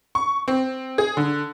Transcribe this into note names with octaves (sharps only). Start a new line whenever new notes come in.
C#6
C4
G#4
D3